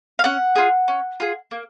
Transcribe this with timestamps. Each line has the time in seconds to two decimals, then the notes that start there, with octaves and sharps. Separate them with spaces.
0.19 F5
0.24 C#4 F#5
0.56 F4 G#4
0.88 C#4
1.20 F4 G#4
1.51 A#3